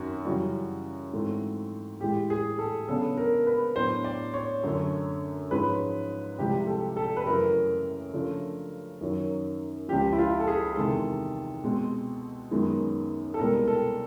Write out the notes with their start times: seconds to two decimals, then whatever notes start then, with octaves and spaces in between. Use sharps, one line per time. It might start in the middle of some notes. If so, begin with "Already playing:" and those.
Already playing: F#2 D#3 C4 F#4
0.25 F#2 C#3 E3 G3 F#4
1.13 G#2 E3 A3 C4
2.01 A2 E3 G#3 G4
2.30 G#4
2.59 A4
2.88 C#3 F#3 B3 D4 A4
3.18 A#4
3.47 B4
3.76 A2 F#3 B3 D4 C5
4.04 D5
4.34 C#5
4.63 F#2 D3 F#3 A3 C#4
5.51 G#2 F3 G#3 C#4 B4
6.38 C2 C3 F3 G#3 G4
6.67 A4
6.97 A4
7.17 B4
7.26 F#2 C#3 E3 A3 A#4
8.13 C#3 F3 A3 D4
9.01 F#2 D#3 F#3
9.88 C#2 C#3 F3 G4
10.13 E4
10.18 F4
10.40 A4
10.47 G#4
10.76 E2 C3 D#3 G#3 A4
11.64 B2 G#3 C4
12.51 F#2 D#3 G#3 B3
13.34 A4
13.39 C2 B2 G#3 B3 A#4
13.67 A4